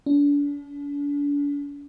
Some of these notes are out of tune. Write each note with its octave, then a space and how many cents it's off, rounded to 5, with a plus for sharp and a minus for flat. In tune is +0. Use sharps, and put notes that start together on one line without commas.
D4 -40